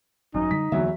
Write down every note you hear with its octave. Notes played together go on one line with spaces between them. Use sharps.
G#1 F#2 D#4
D3 G3 B6
E2 D3 F#3 A#3 E5